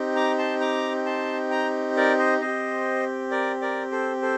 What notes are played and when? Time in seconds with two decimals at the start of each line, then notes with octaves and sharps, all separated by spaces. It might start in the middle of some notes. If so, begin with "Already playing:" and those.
Already playing: C4 D#4 G4
0.16 A#5 D6
0.39 A5 C6
0.60 A#5 D6
1.06 A5 C6
1.51 G5 A#5
1.97 A#4 D5
2.18 C5 D#5
2.41 C4 G4 C5 D#5
3.31 A#4 D5
3.61 A#4 D5
3.91 A4 C5
4.22 A4 C5